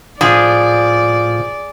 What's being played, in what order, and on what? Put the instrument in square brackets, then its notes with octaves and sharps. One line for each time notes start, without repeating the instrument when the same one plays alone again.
[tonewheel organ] A2 [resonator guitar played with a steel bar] F3 [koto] G#4 [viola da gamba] D5